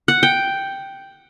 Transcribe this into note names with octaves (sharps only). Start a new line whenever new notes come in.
F#5
G5